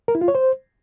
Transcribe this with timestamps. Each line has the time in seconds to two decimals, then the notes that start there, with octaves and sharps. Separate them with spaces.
0.08 A#4
0.15 E4
0.21 F4
0.28 C#5
0.35 C5